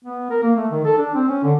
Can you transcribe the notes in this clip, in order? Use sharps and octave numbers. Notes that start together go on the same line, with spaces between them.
B3
A#4
A#3
A3
D#3
A4
D4
C4
C#4
D3